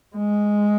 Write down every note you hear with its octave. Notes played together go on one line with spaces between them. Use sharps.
G#3